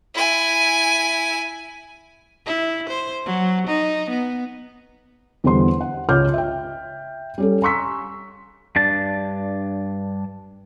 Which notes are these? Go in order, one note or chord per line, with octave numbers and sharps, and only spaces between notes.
E4 G#5
E4
C5
F#3
D#4
B3
E2 D3 G3 C5 C6
F#5
C#2 F4 C#5 D6 F6 G6
E5 G5
G3 C#4 A4
G#5 A#5 C6 C#6 E6 B6
G2 D4 A5